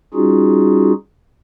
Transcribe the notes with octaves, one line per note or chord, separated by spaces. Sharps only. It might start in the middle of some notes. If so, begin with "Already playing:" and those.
G3 C#4 D#4 F4 F#4 G#4